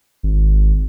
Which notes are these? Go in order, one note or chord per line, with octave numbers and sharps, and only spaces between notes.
G#1